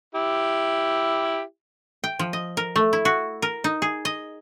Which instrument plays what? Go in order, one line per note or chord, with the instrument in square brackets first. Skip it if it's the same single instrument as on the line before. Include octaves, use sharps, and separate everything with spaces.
[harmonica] E4 G4
[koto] G5
F3
D#5
A#4
A3
E4
F#4
A#4
D#4
G#4
D#5